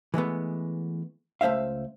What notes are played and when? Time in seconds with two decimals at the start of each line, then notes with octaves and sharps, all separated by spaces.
0.14 E3 G#3 A3 B3
1.41 C#2 A3 C5 E5 F5